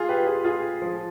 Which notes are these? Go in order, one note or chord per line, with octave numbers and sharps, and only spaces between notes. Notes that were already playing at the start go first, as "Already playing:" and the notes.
Already playing: F4 G#4
G4 B4
F4 G#4
F4 G#4
F3